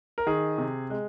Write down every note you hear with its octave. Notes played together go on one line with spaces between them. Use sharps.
A#4
D#3 G#4
C3
G#3